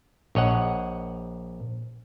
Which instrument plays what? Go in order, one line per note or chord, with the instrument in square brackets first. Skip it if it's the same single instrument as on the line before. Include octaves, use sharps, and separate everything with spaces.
[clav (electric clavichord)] A#1 C#5 D#5 F#5